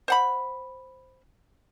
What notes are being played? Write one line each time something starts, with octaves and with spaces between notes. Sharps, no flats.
C5 F#5 B5